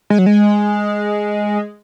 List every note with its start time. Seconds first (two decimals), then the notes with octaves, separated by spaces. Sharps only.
0.10 G#3
0.18 F#3
0.26 G#3